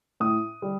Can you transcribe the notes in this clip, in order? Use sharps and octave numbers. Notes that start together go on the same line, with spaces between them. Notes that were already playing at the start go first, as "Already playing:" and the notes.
A2 D#6
G3